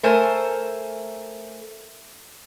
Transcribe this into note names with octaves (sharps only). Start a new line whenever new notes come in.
A3 A4 A#4 C5 G#5